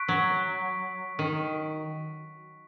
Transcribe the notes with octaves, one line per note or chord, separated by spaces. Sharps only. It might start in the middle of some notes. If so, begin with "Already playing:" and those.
Already playing: C#6 F#6 B6 D7
F#3
D#3